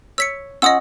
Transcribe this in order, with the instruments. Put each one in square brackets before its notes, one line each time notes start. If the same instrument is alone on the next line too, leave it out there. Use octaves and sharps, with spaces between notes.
[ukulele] C#5 [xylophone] E6 B6 C#7
[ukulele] C#4 F4 F#5 [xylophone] D#5 D#6 E6